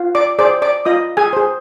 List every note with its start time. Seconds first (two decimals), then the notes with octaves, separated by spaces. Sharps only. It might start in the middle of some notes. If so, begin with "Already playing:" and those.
Already playing: F4
0.15 D5 D6
0.39 G#4 C5 D5 D6
0.62 D5 D6
0.85 F4 D#5 D#6
1.17 G#4 G#5
1.33 G#4 C5